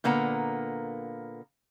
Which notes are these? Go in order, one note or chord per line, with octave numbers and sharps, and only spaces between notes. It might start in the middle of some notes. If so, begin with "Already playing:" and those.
A#2 D3 A#3 B3 A#5